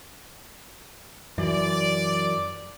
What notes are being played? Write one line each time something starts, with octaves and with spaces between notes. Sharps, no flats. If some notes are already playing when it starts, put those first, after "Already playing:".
F#2 E3 D5